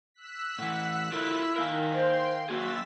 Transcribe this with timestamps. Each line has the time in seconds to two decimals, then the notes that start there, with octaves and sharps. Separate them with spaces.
0.14 E6 F#6 B6
0.59 A2 E3 F#5
1.12 E4 F4 A4 A#4
1.56 D#3 A#4 F5 G#5
1.93 C5 G5 C6
2.49 F#3 A#3 F#4 G#4 E6 A6 B6